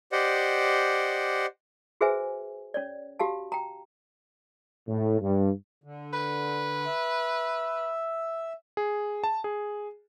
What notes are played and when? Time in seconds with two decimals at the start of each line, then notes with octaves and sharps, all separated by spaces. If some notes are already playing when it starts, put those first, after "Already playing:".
0.12 G4 C5 D5 D#5 F#5
2.01 F#4 G#4 B4 C5 E5 G#5
2.74 C#4 C#5 D5
3.20 F#4 G4 F5 A5
3.52 G5 A#5
4.88 A2
5.21 G2
5.84 D3
6.13 B4
6.86 E5
8.77 G#4
9.24 A5
9.44 G#4